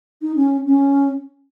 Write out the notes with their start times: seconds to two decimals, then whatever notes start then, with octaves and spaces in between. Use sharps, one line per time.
0.22 D#4
0.36 C#4
0.66 C#4